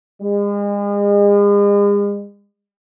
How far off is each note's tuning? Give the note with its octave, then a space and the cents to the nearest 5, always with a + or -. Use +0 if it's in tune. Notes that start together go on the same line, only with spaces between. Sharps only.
G#3 -40